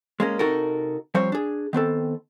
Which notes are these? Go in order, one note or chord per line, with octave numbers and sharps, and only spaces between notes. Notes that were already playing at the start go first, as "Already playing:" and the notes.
G#3 A#3 C#4
C3 D#4 F#4 A4 A#4
F3 G3 C4 C5 C#5
D4 G#4
D#3 B3 C4 A4